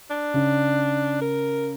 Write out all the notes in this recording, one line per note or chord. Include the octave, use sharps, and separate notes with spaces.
D4
C#3
A#4